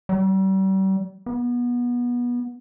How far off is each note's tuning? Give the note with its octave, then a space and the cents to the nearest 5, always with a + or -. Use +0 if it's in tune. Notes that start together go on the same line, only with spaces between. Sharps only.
G3 -40
B3 -25